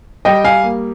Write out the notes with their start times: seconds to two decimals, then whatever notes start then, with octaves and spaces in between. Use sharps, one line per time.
0.25 G3 D#5 G5
0.45 F5 G#5
0.64 A#3